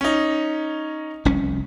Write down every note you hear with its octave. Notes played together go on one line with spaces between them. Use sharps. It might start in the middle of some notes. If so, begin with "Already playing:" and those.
C#4 D#4
F1 C2 C#4